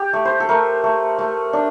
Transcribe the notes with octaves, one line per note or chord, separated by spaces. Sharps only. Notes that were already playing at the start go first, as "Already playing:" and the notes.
Already playing: G4
A3
C5
A4
A3 A#4
A3
A3
D4